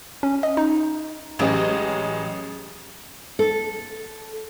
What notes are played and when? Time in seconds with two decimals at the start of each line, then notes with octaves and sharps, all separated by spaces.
0.23 C#4
0.43 D#5
0.57 D#4
1.39 A1 F#3 G#3 C#4 G4 D#5
3.39 A4